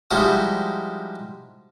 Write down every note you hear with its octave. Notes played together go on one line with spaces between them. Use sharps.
F3 G3 G#3 D#4 E4 F#4